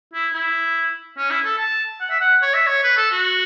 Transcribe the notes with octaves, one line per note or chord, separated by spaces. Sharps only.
E4
E4
C#4
E4
A4
A5
F#5
E5
F#5
C#5
E5
C#5
B4
A4
F#4